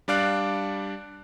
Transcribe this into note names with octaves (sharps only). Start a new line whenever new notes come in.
G3 D4 D5 F5 F#6 D7